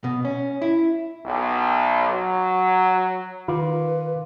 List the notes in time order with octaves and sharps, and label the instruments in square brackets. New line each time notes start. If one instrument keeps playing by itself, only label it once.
[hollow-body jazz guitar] B2
C#4
E4
[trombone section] B1
F#3
[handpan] D#3 [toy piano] F4 [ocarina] B4 [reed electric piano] F5 C6 D6